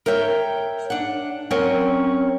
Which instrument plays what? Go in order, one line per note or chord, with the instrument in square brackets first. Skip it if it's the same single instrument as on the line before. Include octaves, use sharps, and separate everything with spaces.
[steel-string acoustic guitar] A#4 C#5 E5 G5
D4 F#5
F#3 C4 C#4 A#4 C#5